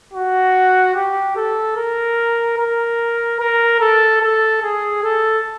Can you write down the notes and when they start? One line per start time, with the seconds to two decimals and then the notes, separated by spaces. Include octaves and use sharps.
0.13 F#4
0.95 G4
1.36 A4
1.76 A#4
2.58 A#4
3.40 A#4
3.80 A4
4.21 A4
4.62 G#4
5.03 A4